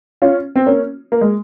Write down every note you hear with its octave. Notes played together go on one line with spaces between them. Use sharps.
C#4 F4
C4
A#3 C#4
A#3
G#3